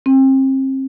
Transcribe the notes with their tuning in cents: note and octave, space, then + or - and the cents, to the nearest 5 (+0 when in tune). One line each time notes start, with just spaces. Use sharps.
C4 +35